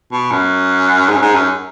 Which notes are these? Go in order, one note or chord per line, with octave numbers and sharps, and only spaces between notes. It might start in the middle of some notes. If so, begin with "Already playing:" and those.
B2
F#2
G#2
F#2
G#2
F#2